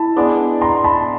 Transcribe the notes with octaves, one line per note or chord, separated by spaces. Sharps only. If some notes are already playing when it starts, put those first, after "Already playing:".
Already playing: E4 A5 B5
G#3 B3 D4
A#5 C6
A5 B5